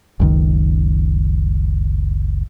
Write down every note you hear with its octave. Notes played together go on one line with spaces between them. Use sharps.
F#1 C#2 D#3